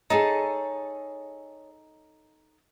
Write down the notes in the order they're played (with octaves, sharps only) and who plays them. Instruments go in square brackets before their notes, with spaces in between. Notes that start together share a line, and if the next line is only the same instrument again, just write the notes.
[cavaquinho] D#4 A4 A5 [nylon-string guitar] G#4 C#5